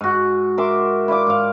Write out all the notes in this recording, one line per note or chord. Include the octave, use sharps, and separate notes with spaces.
G#2 F#4
A#4 E5 C6 D6
E4 F4 D5 D6
G#2 F5